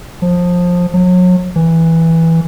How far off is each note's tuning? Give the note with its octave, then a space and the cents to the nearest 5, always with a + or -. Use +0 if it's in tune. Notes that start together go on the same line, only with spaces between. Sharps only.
F3 +20
F#3 -35
E3 -5